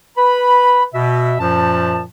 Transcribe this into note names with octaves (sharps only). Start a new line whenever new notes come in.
B4 B5
B2 E5
F#2 A#2 F3 A5